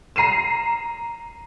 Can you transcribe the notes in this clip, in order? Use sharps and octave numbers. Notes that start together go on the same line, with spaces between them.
A#5 C7 D#7 E7